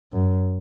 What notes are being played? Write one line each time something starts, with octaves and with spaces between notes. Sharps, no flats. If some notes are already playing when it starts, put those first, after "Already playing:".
F#2